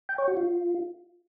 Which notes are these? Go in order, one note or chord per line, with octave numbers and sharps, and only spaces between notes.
G5
C#5
F#4
F4